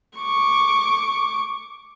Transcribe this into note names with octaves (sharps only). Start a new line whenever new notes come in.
C#6 D6